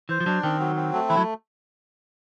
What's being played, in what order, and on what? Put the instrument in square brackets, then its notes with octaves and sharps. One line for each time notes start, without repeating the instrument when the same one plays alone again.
[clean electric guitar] E3 [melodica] C5
[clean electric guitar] F3
[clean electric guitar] F#3 [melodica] D4
[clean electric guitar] D#3 [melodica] C4
[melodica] F#3
C4
A3
[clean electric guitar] E3 [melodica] E4
[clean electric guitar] F#3